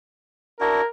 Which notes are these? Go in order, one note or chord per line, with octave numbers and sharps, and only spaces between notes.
D4 E4 F#4 A#4